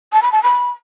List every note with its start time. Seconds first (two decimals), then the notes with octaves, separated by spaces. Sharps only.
0.13 A5
0.22 B5
0.32 A5
0.43 B5